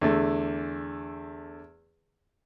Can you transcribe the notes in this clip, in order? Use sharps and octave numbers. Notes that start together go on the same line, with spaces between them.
E2 D3 A3